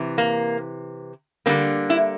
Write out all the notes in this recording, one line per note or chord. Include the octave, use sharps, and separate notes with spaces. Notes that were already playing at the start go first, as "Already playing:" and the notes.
Already playing: C3 E3
A#3
D3 G3 A#3 C4
E4